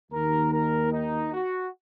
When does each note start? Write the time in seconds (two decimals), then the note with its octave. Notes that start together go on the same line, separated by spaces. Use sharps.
0.12 D#2 D#3 A#4
0.52 A#4
0.92 D#4
1.32 F#4